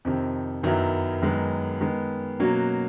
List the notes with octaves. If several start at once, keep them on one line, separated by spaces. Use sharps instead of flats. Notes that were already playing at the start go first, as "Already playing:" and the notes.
F2 C3 D#3
F#2 D#3 F#3 B3 E4
F#2 D#3 G#3 B3
D#3 G#3 B3
B2 F#3 A#3 C#4 F#4